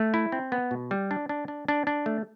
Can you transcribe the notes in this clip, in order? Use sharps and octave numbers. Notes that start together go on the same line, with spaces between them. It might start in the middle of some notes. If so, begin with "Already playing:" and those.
Already playing: A3
E4
C4
B3
B2
G3
D4
D4
D4
D4
D4
A3